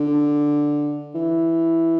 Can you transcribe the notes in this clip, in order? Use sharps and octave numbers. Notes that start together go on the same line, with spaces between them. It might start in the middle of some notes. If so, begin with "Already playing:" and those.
Already playing: D3
E3